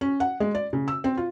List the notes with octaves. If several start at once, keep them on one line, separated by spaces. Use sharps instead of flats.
C#4
F#5
G#3
D5
C#3
E6
C4
F4